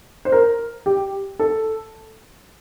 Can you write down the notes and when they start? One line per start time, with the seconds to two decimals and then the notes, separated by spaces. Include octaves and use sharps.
0.25 C5
0.32 A#4
0.86 G4
1.39 A4